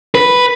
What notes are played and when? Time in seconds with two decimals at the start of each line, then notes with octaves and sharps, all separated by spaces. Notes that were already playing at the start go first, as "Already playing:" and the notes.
0.15 B4